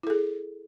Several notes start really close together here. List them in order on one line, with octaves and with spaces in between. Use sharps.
E4 A4 G#4